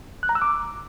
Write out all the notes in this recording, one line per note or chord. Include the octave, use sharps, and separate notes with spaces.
F#6
A#5
E6
D6